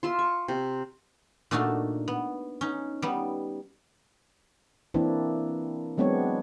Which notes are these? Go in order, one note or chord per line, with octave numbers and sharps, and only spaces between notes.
F4 E5 C6
C#6
C3
A#2 A3 D4 D#4 F#4
B3
C#4 D#4
G3 B3 D#4
E3 A#3 C4 D4 E4
F#3 G#3 B3 C4 D4 C#5